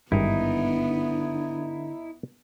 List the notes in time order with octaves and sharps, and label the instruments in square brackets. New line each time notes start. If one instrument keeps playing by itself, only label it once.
[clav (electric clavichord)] G#1 G2 [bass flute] D3 [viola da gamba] B3 [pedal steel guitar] D#4 E4